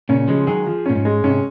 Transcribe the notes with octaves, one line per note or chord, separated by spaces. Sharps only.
A#2 C#3 C#4
C#3 F3 G#3
D#3 F#3 G#4
F3
A#2 C#4
G#2
G#3
G#2 C3 C#4